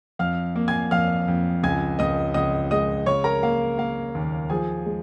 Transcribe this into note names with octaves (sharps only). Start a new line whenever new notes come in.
F2 F5 F6
A#3
G#5 G#6
F2 F5 F6
F2
C#2 G#5 G#6
C#2 D#5 D#6
C#2 D#5 D#6
G#3 D#5 D#6
C#3 C#5 C#6
A#4 A#5
A#3 F5
A#3 F5
D#2
F3 G#4 G#5
G#3